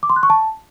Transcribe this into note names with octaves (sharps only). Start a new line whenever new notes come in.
D6
C6
F#6
C#6
A5